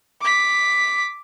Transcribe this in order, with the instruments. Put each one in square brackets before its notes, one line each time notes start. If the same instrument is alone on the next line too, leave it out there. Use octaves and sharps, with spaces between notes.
[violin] D6 B6